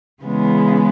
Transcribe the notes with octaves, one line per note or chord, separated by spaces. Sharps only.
C#3 E3 G#3 B3